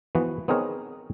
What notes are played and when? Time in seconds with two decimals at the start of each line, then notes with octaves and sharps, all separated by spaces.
0.15 E3 F3 B3 F#4
0.48 B3 C4 D#4 G#4 A#4 C#5